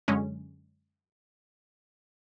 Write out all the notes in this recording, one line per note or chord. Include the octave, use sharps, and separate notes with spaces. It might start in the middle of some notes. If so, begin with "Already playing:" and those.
F#2 D3 G#3 C#4